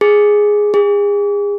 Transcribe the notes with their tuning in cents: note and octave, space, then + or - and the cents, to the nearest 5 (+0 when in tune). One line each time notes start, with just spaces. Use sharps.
G#4 +0
G#4 -35